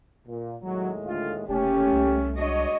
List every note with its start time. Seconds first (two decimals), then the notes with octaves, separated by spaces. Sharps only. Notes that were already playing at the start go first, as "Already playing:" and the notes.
0.27 A#2
0.62 D#2 A2 F#3 G#3
1.06 D2 F4
1.48 F1 C#3 A3 A#3 C#4 G4
1.92 C2
2.36 G#3 D4 F#4 C#5 D#5